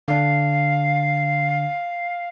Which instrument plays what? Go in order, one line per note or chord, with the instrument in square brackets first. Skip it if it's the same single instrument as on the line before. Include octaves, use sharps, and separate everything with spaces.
[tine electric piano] D3 D4 [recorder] F5